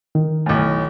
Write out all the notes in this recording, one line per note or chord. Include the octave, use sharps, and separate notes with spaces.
D#3
B1 A2